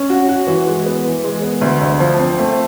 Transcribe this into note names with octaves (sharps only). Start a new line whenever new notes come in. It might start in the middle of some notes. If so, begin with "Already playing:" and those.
Already playing: C#4
F#4
F#4
E3
G#3
B3
E3
G#3
B3
D2
D2
F3
C4
A3